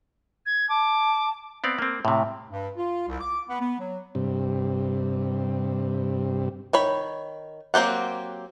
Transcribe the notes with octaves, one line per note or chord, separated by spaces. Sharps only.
G#6
A5 D6
B3 C4 D5 F5
A#3 C4
A2 C3
G2
F4
C2
D6
B3
B3
F#3
G2 C3
D#3 C#5 B5
F#3 A#3 C4 G4 F#5